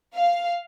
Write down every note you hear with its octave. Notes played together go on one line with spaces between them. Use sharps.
F5